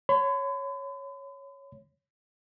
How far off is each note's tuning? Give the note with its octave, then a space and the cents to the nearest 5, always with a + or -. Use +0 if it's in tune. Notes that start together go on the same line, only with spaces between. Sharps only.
C#5 +0 B5 +45